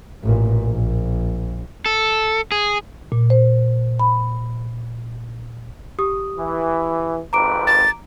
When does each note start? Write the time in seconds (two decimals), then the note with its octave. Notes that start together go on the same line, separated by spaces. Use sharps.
0.23 A1 A#2
0.63 A#1
1.86 A4
2.52 G#4
3.12 A#2
3.30 C5
3.99 B5
5.99 G4 D#6
6.37 E3
7.33 G#1 F2 B4 A#5 D6 D7
7.67 A6